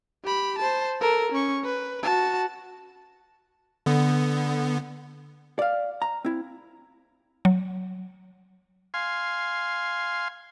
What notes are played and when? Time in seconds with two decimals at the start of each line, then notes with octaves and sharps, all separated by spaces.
0.24 G4 B5
0.58 C5 A5
1.01 A4 A#4
1.32 C#4 C#6
1.64 B4
2.03 F#4 A5
3.86 D3 B3
5.59 D5 F5
6.02 A#5
6.25 C4 E4
7.45 F#3
8.94 F5 G#5 C6